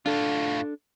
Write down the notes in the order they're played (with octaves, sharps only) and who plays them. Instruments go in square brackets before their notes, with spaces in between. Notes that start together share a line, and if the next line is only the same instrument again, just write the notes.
[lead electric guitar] A2 F4 [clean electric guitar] D4 A4